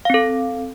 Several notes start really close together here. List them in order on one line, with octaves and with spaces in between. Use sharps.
F5 C4 A4